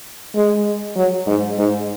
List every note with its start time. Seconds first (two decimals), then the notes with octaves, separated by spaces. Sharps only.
0.35 G#3
0.96 F#3
1.27 G#2
1.58 G#2